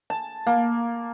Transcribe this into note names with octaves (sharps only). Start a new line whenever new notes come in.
A5
A#3